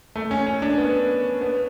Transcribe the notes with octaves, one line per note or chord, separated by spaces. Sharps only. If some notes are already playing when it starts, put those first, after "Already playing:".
A3
C#4
C#4
D4
B3
B3